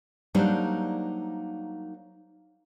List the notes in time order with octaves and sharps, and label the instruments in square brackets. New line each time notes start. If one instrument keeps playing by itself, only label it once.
[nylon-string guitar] F#3 G3 A#3 D4 D#4 C5